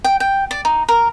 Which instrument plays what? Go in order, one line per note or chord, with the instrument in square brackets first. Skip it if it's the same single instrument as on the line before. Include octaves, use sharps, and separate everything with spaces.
[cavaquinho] G5
G5
D5
D#4
A#4